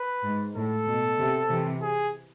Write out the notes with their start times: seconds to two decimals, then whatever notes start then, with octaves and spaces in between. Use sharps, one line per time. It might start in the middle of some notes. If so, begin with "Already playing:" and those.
Already playing: B4
0.24 G#2
0.55 A2 A4
0.87 B2
1.18 C3
1.49 C3 E3
1.81 G#4